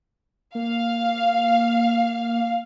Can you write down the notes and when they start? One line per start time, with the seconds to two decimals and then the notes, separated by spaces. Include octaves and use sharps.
0.55 A#3 F5